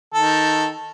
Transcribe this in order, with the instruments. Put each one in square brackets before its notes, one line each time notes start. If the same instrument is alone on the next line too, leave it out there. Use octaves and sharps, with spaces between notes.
[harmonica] D#3 A4